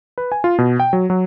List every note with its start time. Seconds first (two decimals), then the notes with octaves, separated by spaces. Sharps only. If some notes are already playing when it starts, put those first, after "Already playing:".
0.18 B4
0.32 G#5
0.44 F4
0.58 B2
0.80 G5
0.93 F#3
1.10 F#3